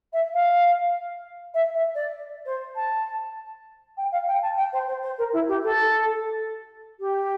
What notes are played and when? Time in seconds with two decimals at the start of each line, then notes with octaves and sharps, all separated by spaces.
0.13 E5
0.33 F5
1.54 E5
1.74 E5
1.94 D5
2.45 C5
2.75 A5
3.97 G5
4.11 F5
4.27 G5
4.42 A5
4.57 G5
4.72 C5
4.87 C5
5.02 C5
5.18 A#4
5.33 E4
5.48 G4
5.63 A4
6.99 G4